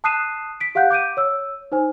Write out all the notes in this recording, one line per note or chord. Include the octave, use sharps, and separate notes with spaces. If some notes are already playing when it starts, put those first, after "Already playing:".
A5 D#6 F#6 C7 D#7 E7
B6 D7
G4 F5 F#5 F#6 G6
D6 G6 D7 D#7
C#5 E6
D#4 C5 G#5